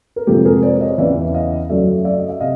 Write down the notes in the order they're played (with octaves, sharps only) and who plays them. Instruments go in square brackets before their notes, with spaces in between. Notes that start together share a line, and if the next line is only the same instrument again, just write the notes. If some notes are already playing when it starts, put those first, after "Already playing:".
[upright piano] A#4
F2 C3 F3 G#3 G4 A4
G#4 A#4
C5 D5
C#5 D#5
E2 C#3 E3 D5 E5
D#5 F5
F#2 C#3 F#3 A3 D5 E5
D5 E5
D#5
E5
C3 D#5 F5